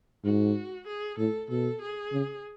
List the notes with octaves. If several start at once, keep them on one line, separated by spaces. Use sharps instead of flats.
G#2 F#4
G#4
A2 A4
B2 A4
G#4
C#3